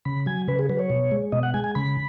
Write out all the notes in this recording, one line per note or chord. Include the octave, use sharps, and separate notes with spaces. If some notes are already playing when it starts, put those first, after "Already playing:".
C#3 B5
F#3 G#5
C#3 B4
G#4
F#3 B4
C#5
B2
G#3
B2 D#5
F#5
G#3 G#5
G#5
C#3 B5